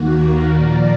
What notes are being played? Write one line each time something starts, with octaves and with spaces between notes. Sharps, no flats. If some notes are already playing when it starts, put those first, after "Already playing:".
Already playing: D#2 D#3 A#3 F#4
F#4 A#4
A#2 F3 A#3 A#4 D5